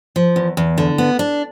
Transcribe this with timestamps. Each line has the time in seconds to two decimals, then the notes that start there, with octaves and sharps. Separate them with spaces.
0.16 F3
0.36 E2
0.57 E2
0.78 D3
0.98 B3
1.19 D4